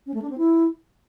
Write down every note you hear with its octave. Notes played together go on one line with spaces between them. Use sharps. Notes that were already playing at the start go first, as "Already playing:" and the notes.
C#4
A3
D4
C4
E4